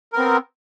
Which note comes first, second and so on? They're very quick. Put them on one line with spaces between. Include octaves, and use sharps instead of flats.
A#4 B3 C4